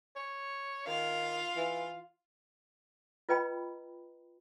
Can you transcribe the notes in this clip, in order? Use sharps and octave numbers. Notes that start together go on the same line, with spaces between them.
C#5
D#3 F4 F5
E3
F4 B4 D#5 G5 A#5 B5